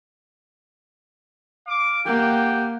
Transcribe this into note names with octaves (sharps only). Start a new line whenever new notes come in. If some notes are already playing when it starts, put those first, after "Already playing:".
F5 D6
A#3 G4 F#5 G5